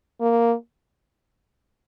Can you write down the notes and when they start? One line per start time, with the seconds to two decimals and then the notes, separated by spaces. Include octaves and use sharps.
0.21 A#3